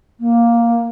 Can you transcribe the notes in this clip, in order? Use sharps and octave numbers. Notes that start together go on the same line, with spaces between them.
A#3